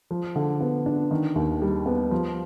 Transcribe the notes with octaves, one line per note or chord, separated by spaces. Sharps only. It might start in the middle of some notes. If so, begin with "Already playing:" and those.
F3
D3
B3
D4
D#3
D#2
G3
B3
F3